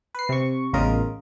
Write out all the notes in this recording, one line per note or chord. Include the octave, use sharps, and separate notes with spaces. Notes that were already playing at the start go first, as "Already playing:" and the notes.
B4 C7
C3 C#6
A1 E2 C#3 F4 A#4 D#5